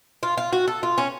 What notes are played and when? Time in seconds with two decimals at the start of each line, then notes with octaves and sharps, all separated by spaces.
0.23 F4
0.37 F4
0.53 F#4
0.68 A4
0.83 F4
0.98 C#4